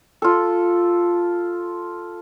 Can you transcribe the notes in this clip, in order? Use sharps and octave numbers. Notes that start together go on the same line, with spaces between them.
F4 A4